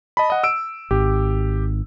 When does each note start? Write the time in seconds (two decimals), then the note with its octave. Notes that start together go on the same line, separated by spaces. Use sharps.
0.17 D#5 A5 B5
0.30 D#5 F#5
0.44 E6 D7
0.91 G#1 G4